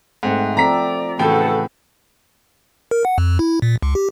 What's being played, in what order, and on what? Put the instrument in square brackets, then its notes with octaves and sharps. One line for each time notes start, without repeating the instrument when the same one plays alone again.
[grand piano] G#2 [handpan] A3 C4 F#5
[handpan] F3 C4 A4 [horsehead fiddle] D5 [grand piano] A#5 B6
[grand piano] A2 C#3 G5 [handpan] E3 F#4 [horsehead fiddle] A4 F#5
[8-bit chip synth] A#4
F#5
F2
E4
A#2
C#2
G4